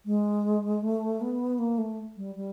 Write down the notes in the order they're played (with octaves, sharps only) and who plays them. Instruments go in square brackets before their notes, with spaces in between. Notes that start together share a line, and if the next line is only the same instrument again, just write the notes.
[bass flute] G#3
A3
B3
A#3
A3
G3
G3